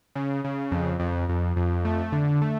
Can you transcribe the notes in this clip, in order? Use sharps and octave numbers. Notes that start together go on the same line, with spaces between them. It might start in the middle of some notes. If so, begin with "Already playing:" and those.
C#3
C#3
F2
F2
F2
F2
A3
D3
A3